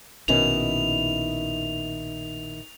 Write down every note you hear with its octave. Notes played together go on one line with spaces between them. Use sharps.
A#1 B2 D#3 C#4 E4 F7